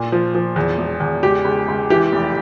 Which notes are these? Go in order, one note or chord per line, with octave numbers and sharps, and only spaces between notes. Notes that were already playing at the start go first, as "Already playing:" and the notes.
Already playing: A#2
F3
F3
E2
E1
E2
C#2 G4
C#2
C#2
E3 G4
F1